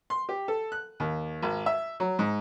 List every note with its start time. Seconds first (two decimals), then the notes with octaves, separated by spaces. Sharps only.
0.10 C6
0.29 G4
0.48 A4
0.72 F#6
1.00 D#2
1.42 G#1
1.66 E5
2.00 F#3
2.19 G#2